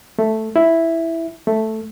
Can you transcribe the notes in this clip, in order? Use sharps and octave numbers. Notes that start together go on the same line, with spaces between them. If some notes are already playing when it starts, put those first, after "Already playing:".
A3
E4
A3